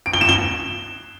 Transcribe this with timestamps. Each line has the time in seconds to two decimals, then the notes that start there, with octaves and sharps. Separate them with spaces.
0.06 D7
0.13 G7
0.21 E7
0.29 G7